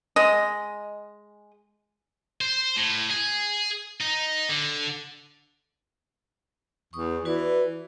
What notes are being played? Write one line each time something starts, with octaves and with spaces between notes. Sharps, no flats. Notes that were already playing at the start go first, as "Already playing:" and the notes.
G#3 D#5
C5
A2
G#4
D#4
D3
E2 C#6 D#6
E3 F#4 B4 D5